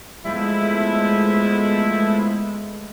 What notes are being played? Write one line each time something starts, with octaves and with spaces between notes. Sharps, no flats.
F3 G#3 A3 B3 E4